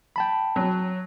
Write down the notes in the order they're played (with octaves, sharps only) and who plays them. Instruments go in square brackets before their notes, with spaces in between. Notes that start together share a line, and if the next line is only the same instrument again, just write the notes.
[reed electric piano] G5 A5 B5
[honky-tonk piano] F#3